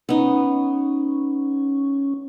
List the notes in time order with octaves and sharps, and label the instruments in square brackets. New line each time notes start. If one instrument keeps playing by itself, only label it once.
[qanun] B3 D#4 [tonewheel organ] C#4